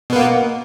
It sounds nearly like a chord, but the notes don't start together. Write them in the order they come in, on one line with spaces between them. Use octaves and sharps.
B2 B3 A#3